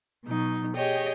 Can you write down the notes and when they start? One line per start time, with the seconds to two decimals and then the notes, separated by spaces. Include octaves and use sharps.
0.24 B2 F#3 D#4
0.76 G4 G#4 C#5 D#5 G5